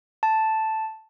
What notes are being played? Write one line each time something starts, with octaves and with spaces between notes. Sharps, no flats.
A5